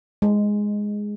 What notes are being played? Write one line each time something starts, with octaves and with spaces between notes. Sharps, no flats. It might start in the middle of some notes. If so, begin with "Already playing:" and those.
G#3